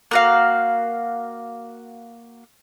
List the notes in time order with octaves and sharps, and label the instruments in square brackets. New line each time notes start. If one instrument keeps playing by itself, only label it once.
[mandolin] A#3 F#4 F5